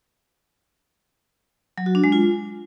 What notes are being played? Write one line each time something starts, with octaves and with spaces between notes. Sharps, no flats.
F#3
F#4
D4
G#3
F4